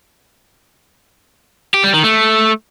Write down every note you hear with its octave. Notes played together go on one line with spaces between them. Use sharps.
G4
G3
D#3
A3